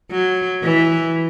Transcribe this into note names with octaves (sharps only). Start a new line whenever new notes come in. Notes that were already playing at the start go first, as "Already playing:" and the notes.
F#3
E3